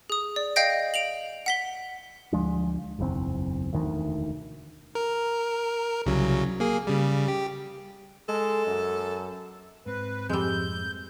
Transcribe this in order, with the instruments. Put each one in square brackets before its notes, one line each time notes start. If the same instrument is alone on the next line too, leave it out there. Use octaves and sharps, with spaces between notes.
[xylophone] G#4 D#6
D5
D#5 F5 G5 G6 A#6 D7
D7 F7 F#7
F#5 B6 G7
[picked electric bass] D2 F3 G#3 D4
F#1 B1 E2 C4
E1 D2 D#3 E3
[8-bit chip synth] A#4
C2 C#3 F#3
A#3 G#4
C#3 G3
G4
[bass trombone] G#3 [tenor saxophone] A4
[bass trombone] F#2
[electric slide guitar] G#2 C4 [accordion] B4
[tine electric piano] F2 E6 [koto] G3 G#3 [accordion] G6